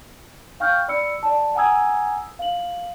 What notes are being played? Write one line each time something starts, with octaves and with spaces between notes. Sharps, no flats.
F5 G5 C#6 F6 G6
D5 B5 E6 C#7
D5 A5
F#5 G#5 A#5 D#6 E6 G#6
F5 F#7